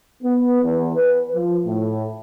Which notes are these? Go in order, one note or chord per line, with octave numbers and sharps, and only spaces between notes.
B3
E2
B4
F3
A2